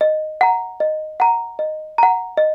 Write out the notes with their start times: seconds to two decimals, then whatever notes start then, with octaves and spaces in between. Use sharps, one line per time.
0.01 D#5
0.41 F#5 A#5
0.80 D#5
1.20 F#5 A#5
1.59 D#5
1.98 F#5 A#5
2.37 D#5